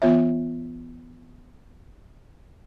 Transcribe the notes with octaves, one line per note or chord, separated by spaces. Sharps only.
E3 B3 F4 C#5 E5